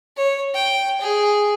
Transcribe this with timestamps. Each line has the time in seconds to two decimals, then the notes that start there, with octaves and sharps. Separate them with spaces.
0.17 C#5
0.55 G5
1.01 G#4